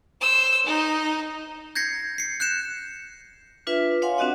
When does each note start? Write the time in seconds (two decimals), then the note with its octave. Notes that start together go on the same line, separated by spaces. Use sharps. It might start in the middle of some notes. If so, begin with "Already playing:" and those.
0.21 C5 E6
0.66 D#4
1.75 G6 G#6 A#6 C7 C#7
2.18 C7 C#7
2.40 F#6 G6 C#7 E7
3.67 D4 F4 B4 E5
4.02 C#5 F5 F#5 G#5 C6
4.18 C4 D4 F#4 D#5 F#5